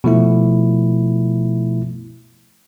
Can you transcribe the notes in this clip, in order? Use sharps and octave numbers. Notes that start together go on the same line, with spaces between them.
B2 F3 A3 E4